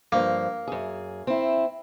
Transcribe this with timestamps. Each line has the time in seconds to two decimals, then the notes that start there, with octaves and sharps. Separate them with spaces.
0.12 G2 F3 A#3
0.67 F#2 G#4
1.27 C4 E4